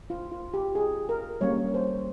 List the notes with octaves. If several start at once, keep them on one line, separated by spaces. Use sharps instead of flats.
F4
F4
G4
G#4
A#4
G3 A#3 C#4 C#5
C5